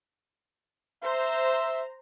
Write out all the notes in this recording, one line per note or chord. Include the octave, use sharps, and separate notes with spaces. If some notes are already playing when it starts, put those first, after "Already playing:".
C5 E5 A#5